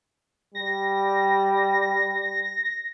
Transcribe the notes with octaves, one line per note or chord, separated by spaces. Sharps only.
G3 A#6